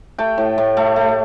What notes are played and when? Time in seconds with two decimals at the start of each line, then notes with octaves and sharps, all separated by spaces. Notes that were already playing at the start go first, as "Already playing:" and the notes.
0.18 A3 G5
0.38 A2
0.58 A2
0.77 A3
0.96 A3